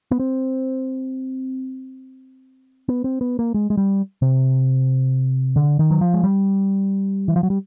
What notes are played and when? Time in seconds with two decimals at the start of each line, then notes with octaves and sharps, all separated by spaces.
0.11 B3
0.20 C4
2.88 B3
3.04 C4
3.21 B3
3.39 A#3
3.54 G#3
3.70 G#3
3.77 G3
4.22 C3
5.56 D3
5.79 D#3
5.91 F#3
6.01 F3
6.14 G#3
6.24 G3
7.28 E3
7.36 F3
7.43 F#3
7.50 G3